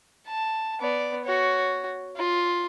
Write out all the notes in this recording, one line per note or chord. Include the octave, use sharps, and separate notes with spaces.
A5
B3 D5
F#4 C#5
F4